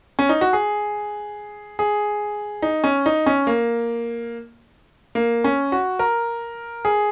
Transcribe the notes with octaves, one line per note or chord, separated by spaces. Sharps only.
C#4
D#4
F#4
G#4
G#4
D#4
C#4
D#4
C#4
A#3
A#3
C#4
F#4
A#4
G#4